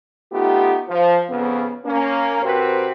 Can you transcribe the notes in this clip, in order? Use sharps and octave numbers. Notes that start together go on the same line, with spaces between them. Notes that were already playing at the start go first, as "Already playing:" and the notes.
A3 B3 D#4 F4 G4
F3
F2 C#3 B3
A#3 C#4
C3 C4 F#4 A#4 B4